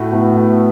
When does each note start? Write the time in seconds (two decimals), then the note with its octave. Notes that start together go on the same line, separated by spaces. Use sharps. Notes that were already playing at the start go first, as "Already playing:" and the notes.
Already playing: A2 A3 F#4
0.12 A2 B3
0.35 A3
0.40 F#4